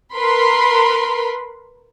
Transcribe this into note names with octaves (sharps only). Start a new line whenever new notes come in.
A#4 B4 B5 C6